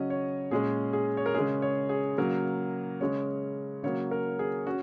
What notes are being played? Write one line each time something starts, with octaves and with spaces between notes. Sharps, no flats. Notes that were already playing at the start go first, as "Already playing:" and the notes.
Already playing: C#3 F#3 C#4 D#5
C#5
A#2 G#3 C#4 G#4
G#4
C#5
A#4
C#3 G#3 C#4 G#4
C#5
G#4
C#3 F#3 A#3 A#4
C#3 G#3 C#4 C#5
C#3 F#3 A#3 C#5
A#4
G#4
C#4 F#4